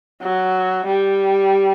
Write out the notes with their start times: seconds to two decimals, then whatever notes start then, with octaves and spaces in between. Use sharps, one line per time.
0.22 F#3
0.87 G3